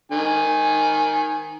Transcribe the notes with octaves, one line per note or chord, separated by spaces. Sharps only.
D#3 G#5